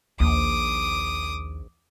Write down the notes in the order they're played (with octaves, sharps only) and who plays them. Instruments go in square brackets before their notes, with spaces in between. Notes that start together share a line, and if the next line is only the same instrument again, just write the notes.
[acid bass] A#1 [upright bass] D#2 [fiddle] D6 D#6